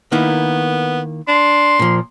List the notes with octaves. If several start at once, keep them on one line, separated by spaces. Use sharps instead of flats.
D#3 A#3 B3 E4
D4 C6
A#2 F3